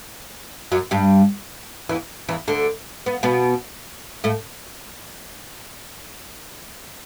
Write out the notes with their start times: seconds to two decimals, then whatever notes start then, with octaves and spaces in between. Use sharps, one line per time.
0.72 F#2 F#3
0.91 G2 G3
1.89 E2 E3
2.29 E2 E3
2.47 D2 D3
3.06 B3
3.23 B2 B3
4.24 A2 A3